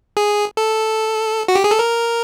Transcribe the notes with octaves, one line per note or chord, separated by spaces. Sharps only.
G#4
A4
F#4
G4
G#4
A4
A#4